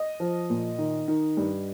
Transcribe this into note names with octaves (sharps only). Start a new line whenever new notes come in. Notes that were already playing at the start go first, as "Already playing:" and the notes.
Already playing: D#5
F3
A#2
D#3
D#3
G2